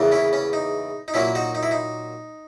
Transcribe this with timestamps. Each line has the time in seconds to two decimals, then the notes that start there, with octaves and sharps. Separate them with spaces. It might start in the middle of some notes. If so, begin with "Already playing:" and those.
Already playing: E2 C#3 E3 A#3
0.12 C#4 E4
0.33 C#4
0.53 D#4
1.08 D#4
1.14 A#2 F#3 A#3 C#4 E4
1.35 D#4 F#4
1.55 D#4
1.63 E4
1.71 D#4